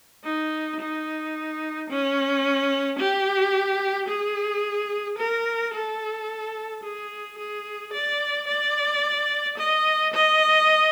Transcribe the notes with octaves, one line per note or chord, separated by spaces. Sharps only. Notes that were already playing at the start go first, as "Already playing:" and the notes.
D#4
D#4
C#4
G4
G#4
A#4
A4
G#4
G#4
D5
D5
D#5
D#5